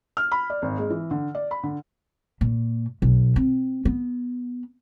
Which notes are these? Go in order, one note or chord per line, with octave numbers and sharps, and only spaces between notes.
F6
B5
D5
G#1
G#3
E3
D3
D5
B5
D3
A#2
B1
C4
B3